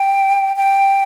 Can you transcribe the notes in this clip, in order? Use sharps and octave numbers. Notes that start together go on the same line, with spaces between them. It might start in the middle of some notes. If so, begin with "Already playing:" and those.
Already playing: G5
G5